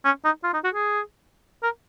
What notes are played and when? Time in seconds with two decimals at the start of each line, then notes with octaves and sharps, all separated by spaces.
0.05 C#4
0.24 D#4
0.44 F4
0.53 D#4
0.64 F#4
0.74 G#4
1.63 A#4